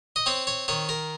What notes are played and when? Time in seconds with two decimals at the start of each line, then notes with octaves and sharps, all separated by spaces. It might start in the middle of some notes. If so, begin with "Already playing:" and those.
0.16 D#5
0.26 C4 C#5
0.47 C#5
0.68 D#3 C#5
0.89 A#4